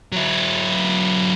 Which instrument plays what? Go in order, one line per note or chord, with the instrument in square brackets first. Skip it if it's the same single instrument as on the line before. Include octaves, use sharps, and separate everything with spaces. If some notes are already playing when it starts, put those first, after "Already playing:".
[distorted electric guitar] F#3 E4